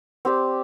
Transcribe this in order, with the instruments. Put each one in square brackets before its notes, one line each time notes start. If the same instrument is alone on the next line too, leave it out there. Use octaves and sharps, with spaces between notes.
[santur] C4 G4 D5